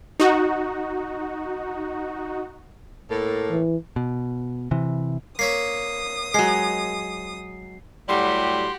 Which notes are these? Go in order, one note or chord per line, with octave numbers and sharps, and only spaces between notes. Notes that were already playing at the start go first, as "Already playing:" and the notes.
D#4 F#4
A2 A#3 A4
E3
B2
C3 E3
A#3 C#5 E5 D#6 C7
F#3 G#3 C7
A2 F#3 G3 F#4 G4 C6